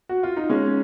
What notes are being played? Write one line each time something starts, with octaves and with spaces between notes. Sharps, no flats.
F#4
F4
D#4
G#3 C#4